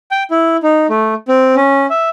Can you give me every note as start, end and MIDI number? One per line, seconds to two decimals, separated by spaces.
0.11 0.23 79
0.31 0.57 64
0.63 0.87 63
0.90 1.14 57
1.28 1.55 60
1.56 1.86 61
1.90 2.09 76